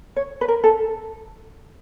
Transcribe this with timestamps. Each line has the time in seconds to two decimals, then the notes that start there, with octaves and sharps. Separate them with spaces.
0.16 C#5
0.41 B4
0.48 A#4
0.64 A4